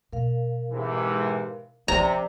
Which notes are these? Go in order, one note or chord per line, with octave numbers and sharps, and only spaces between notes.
B2 A#4 F5
G#2 C3 E3
C3 F3 C#4 D5 A#5